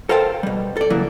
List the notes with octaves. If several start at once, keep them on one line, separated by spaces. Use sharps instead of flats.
A4 A#4 C5 F5 G5 A5
B2 G3
A4 D5
C#3 E3 F#3 A#3 E4